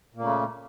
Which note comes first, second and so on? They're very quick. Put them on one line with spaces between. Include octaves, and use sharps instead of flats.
A#2 A#3 C#3 A3